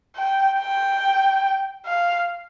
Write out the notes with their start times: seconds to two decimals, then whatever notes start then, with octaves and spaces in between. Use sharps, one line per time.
0.16 G5
0.59 G5
1.86 F5